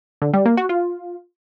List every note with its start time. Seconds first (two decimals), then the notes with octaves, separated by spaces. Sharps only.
0.22 D3
0.34 G3
0.45 A#3
0.57 F#4
0.69 F4